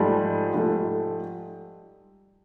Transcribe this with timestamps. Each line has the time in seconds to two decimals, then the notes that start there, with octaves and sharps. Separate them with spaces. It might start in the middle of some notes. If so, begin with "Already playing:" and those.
Already playing: G#2 F3 G3 A3
0.54 G#2 F3 A3